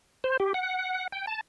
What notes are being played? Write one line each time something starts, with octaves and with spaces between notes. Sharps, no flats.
C5
G4
F#5
G5
A5